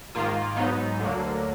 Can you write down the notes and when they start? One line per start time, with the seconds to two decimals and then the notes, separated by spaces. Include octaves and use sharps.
0.15 G#2 D#3 A#3 F4
0.57 G#2 F#3 B3 D#4
0.99 D2 D3 F#3 A#3